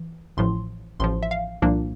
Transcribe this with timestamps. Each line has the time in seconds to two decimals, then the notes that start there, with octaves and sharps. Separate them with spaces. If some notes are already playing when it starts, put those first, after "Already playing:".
Already playing: E3
0.37 A1 A2 F3 C6
1.00 A1 A2 F3 C6
1.23 E5
1.31 F5
1.62 C2 A#2 F3 A#3 D4